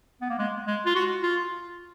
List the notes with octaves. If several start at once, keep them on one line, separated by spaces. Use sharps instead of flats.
B3
A#3
G#3
G#3
F4
F#4
F4